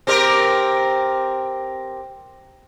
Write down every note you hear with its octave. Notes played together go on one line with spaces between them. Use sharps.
C4 G4 A#4